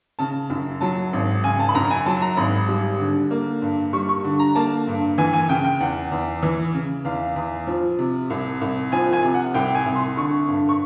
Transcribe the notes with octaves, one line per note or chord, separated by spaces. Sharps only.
C#3 A5
F#2
F#3 A5
G#1
C#3 G#5
A5
B5
F#2 A#5
G#5
F#3 A5
A#5
G#1 B5
G3
D3
A#3
G2
G3 C#6
C#6
D3
A#5
A#3 A5
G2
E3 G#5
G#5
C#3 G5
G5
E2 F#5
E2
E3
C#3
E2 F5
E2
F3
C3
C2
C2
F3 G#5
G#5
C3
F#5
C2 G5
G#5
C2
C6
D3 C#6
G2
C#6